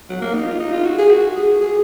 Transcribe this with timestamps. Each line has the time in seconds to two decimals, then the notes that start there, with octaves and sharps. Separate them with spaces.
0.10 F#3
0.21 A#3
0.34 D#4
0.47 F4
0.59 D#4
0.72 F4
0.85 F#4
0.99 G#4
1.11 F#4
1.37 G#4
1.61 G#4